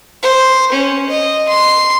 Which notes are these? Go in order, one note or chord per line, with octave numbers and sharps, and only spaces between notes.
C5
C#4
D#5
C6